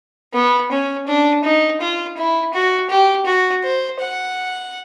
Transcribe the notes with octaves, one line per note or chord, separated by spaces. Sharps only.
B3
C#4
D4
D#4
F4
E4
F#4
G4
F#4
C5
F#5